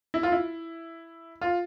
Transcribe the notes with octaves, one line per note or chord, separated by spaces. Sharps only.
E4
F4
E4
F4